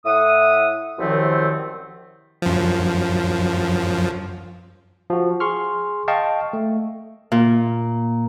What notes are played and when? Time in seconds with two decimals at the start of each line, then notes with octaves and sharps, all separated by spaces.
0.05 A2 E5 F#5 D#6
0.98 C2 F#2 D#3 F3 A3 C4
2.42 F#2 F3
5.10 F3 F#4
5.40 G#4 C6 C#6 F6
6.08 D#5 F5 G5 A5 C#6
6.53 A3
7.32 A#2